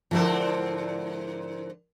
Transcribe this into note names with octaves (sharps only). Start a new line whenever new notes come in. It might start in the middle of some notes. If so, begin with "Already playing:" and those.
G#2 D3 F3 C4 E4 A#4